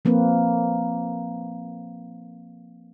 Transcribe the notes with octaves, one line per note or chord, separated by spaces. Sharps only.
F3 A#3 C4 B4